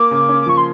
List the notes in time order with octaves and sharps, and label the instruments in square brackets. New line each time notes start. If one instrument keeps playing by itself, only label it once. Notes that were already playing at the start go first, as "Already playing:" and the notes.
Already playing: [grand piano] A#3 [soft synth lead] D6
[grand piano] C#3
C#4
[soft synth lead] D6
[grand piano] F3 [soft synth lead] C#6
[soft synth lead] C6